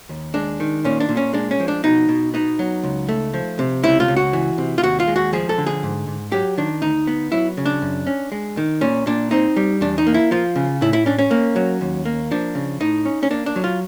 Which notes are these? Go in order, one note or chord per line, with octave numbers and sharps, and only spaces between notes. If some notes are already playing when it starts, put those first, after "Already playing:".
D#2
G#3 D4
D#3
A#2 C#4
D4
A#2
C#4
G#3 D4
C#4
F3
D4
B2 D#4
B2
B3 D#4
F#3
C#2
A3
F3
C3
C#2 E4
F4
C#2
F#4
E3
C3
F4
D#2 F#4
F4
G#3
F#4
F3 G#4
A4
D3
G#4
G#2
G#2
F#3 G4
D#3 D4
D2 D#4
B3
F#3 E4
C#3
D4
F#2
C#4
G#3
D#3
A#2 C#4
A#2 D4
C4 D#4
G3
E2 D4
D#4
A#3
E4
F3 F4
C#3
A2 E4
E4
C#4 D4
C#4
A#3
F#3
D#2
A#3
F3 D4
C#3
A2 D#4
C#4
C#4
A#3 D4
D4
F#3
F4